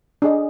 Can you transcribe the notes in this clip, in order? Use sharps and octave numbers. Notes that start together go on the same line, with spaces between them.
D4 G#4 D#5